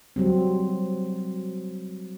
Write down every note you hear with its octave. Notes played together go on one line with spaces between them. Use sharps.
F#3 G3 C4